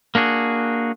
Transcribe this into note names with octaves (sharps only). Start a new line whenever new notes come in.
A#3 D4 F#4 G#4